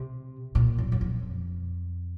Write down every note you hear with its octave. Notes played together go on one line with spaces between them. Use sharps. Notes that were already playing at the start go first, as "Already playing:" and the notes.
Already playing: C3
A#2
F#2
F#2
F2